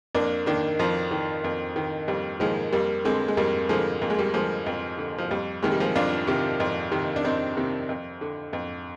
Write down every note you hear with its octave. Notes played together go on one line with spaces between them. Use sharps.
F2 A#3 D4
D#3 A#3 D4
F2 F3
D#3
F2
D#3
F2 G3
D#3 F3 G#3
F2 G3 A#3
D3 G#3 C4
G#3
F2 G3 A#3
D3 F3 G#3
F2 A#3
G#3
G3 A#3
D3 F3 G#3
F2
D3
F3
F2 G3
C3 D#3 G#3
G3
F3 G#3
F2 D4 F4
C3 D#3
F2
C3 D#3
D4
F2 C4 D#4
C3 D#3
F2
D3
F2